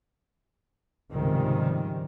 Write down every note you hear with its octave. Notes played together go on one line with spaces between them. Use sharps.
C#2 G#2 C3 D#3 F3 G3